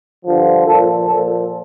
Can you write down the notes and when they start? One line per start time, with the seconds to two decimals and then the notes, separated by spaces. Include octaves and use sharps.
0.25 G2 D3 F3
0.66 A#2 F3 A4
1.06 A#2 F3 A4